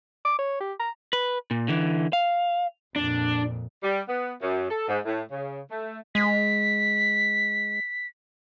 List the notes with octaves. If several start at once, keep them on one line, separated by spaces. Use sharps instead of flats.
D6
C#5
G4
A#5
B4
A#2
D3 E3
F5
F2 A#2 D4
G3
B3
F#2
A4
G#2
A2
C#3
A3
G#3 B6